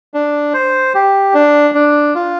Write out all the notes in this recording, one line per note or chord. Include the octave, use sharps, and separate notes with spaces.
D4
C5
G4
D4
D4
F4